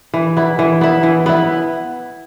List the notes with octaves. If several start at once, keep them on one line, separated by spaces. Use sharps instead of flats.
E3
B3 E4
E3
B3 E4
E3
B3 E4